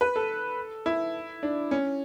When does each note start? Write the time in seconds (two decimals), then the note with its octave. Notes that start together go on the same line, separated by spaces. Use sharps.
0.01 B4
0.16 A4
0.86 E4
1.43 D4
1.71 C#4